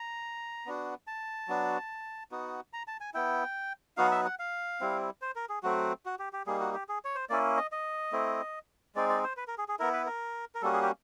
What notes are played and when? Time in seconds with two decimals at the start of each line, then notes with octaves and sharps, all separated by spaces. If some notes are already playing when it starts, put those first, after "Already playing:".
Already playing: A#5
0.66 B3 D4 F#4
1.07 A5
1.48 F#3 B3 D4 F#4
2.31 B3 D#4 F#4
2.73 A#5
2.88 A5
3.01 G#5
3.14 B3 E4 G5
3.97 F#3 B3 D#4 F#4 F5
4.11 E5
4.25 F#5
4.39 F5
4.81 G3 C4 E4
5.22 C5
5.36 A#4
5.49 G#4
5.63 F#3 A3 C4 F#4
6.06 F#4
6.19 G4
6.33 G4
6.47 G3 A#3 D#4 G#4
6.60 F#4
6.74 G4
6.89 G#4
7.05 C#5
7.15 C5
7.29 A#3 C#4 E4 D5
7.57 D#5
7.72 D#5
8.12 A3 C4 E4
8.95 G#3 C4 D#4 D5
9.09 D5
9.24 C5
9.37 B4
9.48 A#4
9.58 G#4
9.68 G#4
9.79 B3 E4 A#4
9.93 B4
10.06 A#4
10.55 A#4
10.62 G3 A#3 C#4 F#4 A4
10.73 G#4
10.82 G4